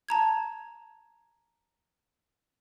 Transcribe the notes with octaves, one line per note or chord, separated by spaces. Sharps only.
A5 A#5 G#6